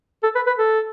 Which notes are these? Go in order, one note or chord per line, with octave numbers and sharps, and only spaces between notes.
A4
B4
B4
A4